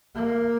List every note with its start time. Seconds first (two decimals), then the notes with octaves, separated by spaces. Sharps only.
0.15 A#3